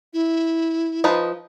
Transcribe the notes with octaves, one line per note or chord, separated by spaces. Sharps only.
E4
F3 D#4 B4